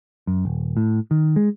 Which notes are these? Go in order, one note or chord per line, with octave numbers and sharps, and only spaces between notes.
F#2
D#1
A2
D#3
G#3